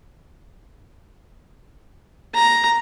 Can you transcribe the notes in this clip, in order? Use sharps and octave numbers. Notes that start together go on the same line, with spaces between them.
A#5